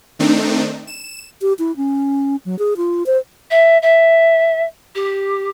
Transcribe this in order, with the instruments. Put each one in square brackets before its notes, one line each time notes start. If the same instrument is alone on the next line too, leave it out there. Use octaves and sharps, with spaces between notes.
[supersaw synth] D#3 A3 C4 D4 D#4
E7
[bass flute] G4
E4
C#4
F#3
G#4
F4
C5
[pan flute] E5
E5
G4